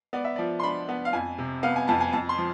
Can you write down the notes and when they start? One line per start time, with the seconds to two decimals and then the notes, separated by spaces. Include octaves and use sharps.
0.13 B3 D5
0.24 E5
0.36 F3 D5
0.60 C6
0.63 D4 B5
0.89 B3
1.05 F5
1.13 F2 G#5
1.38 C3
1.63 B3 F5
1.76 G#5
1.88 F2 A5
2.00 G#5
2.13 F2 A5
2.29 C6
2.38 F3